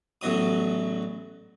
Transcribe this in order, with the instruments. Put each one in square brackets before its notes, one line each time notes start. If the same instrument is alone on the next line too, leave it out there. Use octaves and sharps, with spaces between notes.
[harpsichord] A1 E2 F#3 D#6